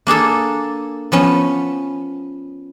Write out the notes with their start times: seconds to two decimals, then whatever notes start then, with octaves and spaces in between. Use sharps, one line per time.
0.07 A#3 D4 G#4 A4
1.12 F3 B3 C#4